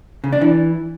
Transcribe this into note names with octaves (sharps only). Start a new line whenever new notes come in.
C#3
D4
E3